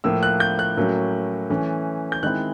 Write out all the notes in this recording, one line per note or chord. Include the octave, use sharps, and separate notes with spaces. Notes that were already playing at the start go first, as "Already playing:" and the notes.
A2 F3 A#3 E6
F#6
G6
F#6
A2 F#3 A#3 C#4
E3 A3 C#4
G6
D#3 G#3 C4 E4 F#6